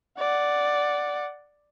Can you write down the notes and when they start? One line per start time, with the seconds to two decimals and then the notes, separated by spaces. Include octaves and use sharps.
0.18 D5 F#5